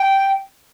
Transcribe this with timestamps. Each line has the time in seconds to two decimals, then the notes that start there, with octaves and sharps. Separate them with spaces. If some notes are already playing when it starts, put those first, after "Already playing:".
Already playing: G5